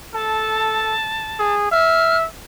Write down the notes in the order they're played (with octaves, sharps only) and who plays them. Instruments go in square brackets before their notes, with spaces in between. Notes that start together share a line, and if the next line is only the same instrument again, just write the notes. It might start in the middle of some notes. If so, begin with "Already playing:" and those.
[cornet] A4 [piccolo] A5
[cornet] G#4
[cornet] E5 [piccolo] F6